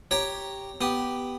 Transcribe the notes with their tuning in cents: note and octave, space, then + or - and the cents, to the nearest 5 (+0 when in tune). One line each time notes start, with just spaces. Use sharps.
G4 +0 C#5 +0 A#5 +0
B3 +0 G4 +0